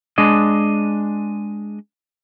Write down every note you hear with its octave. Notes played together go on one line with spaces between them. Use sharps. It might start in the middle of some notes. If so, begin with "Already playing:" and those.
G#3 D4 D#5